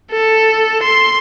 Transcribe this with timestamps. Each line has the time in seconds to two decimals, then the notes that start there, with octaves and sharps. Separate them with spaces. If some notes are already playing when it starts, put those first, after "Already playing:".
0.11 A4
0.83 C6